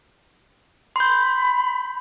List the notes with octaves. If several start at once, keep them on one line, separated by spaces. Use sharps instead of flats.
B5 C6 G6